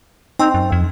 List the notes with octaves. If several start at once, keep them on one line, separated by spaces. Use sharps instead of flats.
C4 D#4
F#2
F2